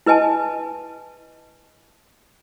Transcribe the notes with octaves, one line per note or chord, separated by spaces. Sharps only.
E4 B4 D#5 G#5 A5